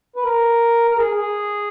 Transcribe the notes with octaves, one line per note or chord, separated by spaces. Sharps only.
B4
A#4
A#4
G#4
G#4